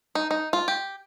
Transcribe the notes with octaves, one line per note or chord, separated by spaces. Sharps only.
D#4
D#4
F4
G4